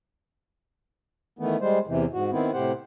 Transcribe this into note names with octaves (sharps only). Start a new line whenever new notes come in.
D#3 E3 A3 B3
G3 G#3 C5
E2 C3 E3
G#2 F#4
D#3 B3 C4 E4
A2 C3 G4 C5 F#5